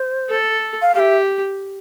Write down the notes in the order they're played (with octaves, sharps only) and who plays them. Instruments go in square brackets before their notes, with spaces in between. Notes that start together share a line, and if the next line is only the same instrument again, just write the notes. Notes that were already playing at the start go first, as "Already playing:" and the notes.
Already playing: [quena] C5
[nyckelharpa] A4
[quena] F5
[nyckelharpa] G4 [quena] F5
[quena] E5